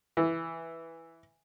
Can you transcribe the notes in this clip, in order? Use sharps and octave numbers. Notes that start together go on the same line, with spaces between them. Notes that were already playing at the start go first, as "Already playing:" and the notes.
E3